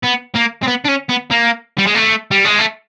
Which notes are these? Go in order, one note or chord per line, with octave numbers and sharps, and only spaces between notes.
B3
A#3
C4
B3
D4
C#4
B3
A#3
G3
G#3
A3
G3
G#3
A3